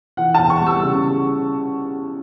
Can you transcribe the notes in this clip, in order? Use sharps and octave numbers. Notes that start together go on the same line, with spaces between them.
E3 F#5
E2 A5
C#6
G3
E6
C#3